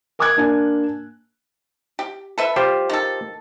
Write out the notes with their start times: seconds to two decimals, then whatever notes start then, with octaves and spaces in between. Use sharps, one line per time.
0.19 A#4 G#5 D6 D#6 F#6 G#6
0.37 A#3 D4 G#5 G#6
1.99 G4
2.38 A4 B4 E5
2.56 G3 F4 G4 C5
2.89 D#3 A4